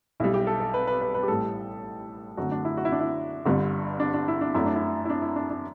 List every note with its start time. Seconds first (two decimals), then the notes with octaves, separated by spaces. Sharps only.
0.20 B1 B2 G3 E4
0.34 G4
0.47 A4
0.60 A4
0.74 B4
0.87 B4
1.01 B4
1.15 B4
1.23 G4
1.28 A1 A2 G3 A4
2.37 F#2 D3 A3 F#4
2.51 D4
2.65 E4
2.77 F#4
2.85 E4
2.92 D4
3.00 E4
3.45 G1 G2 D3 G3
4.00 D4
4.14 D4
4.28 E4
4.41 D4
4.55 F#2 F#3 A3 E4
4.66 D4
4.75 E4
5.05 E4
5.10 D4
5.22 E4
5.36 D4
5.50 D4